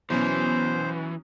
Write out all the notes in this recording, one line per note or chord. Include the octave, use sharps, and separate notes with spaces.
B2 E3 F#3 B3 C#4 C5